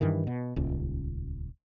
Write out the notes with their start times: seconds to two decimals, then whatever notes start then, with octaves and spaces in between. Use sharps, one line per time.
0.01 G2 D#3 E3
0.27 B2
0.56 D#1 C#2